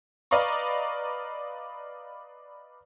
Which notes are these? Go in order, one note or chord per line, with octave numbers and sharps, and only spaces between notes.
B4 D5 D#5 F5 A#5 C#6